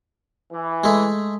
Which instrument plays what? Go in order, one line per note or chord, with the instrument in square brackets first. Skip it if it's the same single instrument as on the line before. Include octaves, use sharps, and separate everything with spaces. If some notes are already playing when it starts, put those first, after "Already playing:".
[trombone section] E3
[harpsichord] G#3 A3